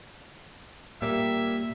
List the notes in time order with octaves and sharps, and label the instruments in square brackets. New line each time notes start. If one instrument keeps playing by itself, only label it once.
[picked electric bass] A#2 [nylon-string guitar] G3 G4 F5 [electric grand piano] A#3 [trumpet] E5